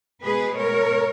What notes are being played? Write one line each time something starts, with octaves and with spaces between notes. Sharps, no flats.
B2 G#3 B3 G#4 B4
A#4 C#5